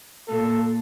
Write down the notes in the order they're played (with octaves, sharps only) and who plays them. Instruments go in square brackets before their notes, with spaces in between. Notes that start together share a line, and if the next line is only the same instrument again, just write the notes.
[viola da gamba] A#2 [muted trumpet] A4